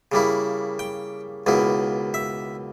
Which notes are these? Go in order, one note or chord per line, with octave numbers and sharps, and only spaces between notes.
C#3 G3 A#3 E4
G5
C#2 B2 A#3 E4
E5